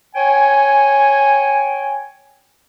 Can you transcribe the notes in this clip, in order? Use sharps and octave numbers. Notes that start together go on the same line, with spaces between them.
C#5 G5 G#5